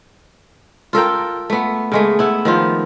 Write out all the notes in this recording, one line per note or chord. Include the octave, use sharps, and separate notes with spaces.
F4 A4 A#4 G5
A3 B3
C#3 G#3 A3
B3 E4
D#3 F3 F4